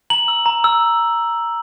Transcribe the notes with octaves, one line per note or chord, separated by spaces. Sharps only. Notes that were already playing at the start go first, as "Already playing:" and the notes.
A#5 F#7
E6
A#5
E6